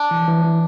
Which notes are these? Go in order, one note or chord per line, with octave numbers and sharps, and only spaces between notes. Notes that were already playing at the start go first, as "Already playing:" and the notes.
Already playing: D4
E3
E3
E3